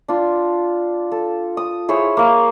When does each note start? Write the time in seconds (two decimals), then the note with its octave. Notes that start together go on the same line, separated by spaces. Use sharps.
0.08 D4 F4
1.12 A4
1.57 D#6
1.89 E4 G#4 C5 C#5
2.17 A#3 F5